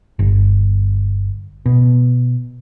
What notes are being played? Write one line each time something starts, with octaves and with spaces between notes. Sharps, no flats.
G1
B2